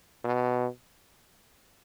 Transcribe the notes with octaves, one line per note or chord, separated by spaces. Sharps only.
B2